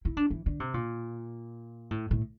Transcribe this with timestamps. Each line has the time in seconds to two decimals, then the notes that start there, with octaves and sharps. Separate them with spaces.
0.05 E4
0.17 D4
0.30 E3
0.46 D3
0.60 C3
0.74 A#2
1.91 A2
2.11 A2